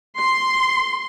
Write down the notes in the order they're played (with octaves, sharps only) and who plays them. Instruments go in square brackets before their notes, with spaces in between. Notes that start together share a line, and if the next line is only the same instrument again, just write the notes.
[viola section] C6